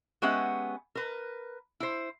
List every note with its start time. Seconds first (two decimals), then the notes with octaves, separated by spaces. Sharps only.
0.22 G#3 B3 C#4 G4 E5 F#5
0.95 A#4 B4
1.80 E4 C5